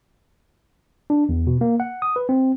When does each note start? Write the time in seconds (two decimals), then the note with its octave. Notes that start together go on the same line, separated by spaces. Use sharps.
1.10 D4
1.29 E2
1.47 B2
1.61 A#3
1.80 F#5
2.02 D#6
2.16 B4
2.29 C4